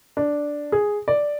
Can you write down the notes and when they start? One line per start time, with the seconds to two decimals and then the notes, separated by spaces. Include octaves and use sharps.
0.17 D4
0.72 G#4
1.08 D5